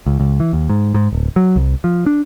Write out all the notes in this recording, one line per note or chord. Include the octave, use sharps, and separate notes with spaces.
C#2
C#2
E3
D#2
G#2
G#2
D1
F#3
C2
F3
D4